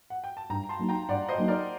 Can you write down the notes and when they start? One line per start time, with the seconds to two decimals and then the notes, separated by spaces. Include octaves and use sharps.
0.10 F#5
0.24 G5
0.37 A5
0.49 G2 G5 A#5
0.69 A5 C6
0.79 F#3 A#3 D#4
0.89 G5 A#5
1.08 G2 D5 F#5
1.28 C5 D#5
1.38 F#3 A#3 D#4
1.48 A#4 D5